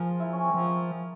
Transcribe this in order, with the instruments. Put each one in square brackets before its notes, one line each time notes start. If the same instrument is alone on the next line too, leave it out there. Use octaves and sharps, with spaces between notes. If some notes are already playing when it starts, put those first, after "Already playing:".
Already playing: [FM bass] F3 [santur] G#4 A#4 C5
[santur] E4
C#4
C4
[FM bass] F3 [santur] C4